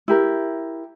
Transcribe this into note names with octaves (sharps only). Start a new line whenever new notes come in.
E4 G4 A#4